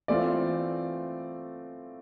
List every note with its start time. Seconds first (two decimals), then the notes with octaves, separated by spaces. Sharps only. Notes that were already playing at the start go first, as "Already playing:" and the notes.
0.08 E3 A3 C4 F4 D5